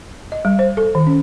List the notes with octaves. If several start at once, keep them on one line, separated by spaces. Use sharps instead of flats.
D#5
G3
C5
A4
D#3
C#4